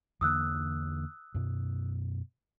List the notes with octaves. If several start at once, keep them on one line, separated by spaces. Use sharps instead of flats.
E2 D3 A#3 D#6 E6 F#6
F#2 B2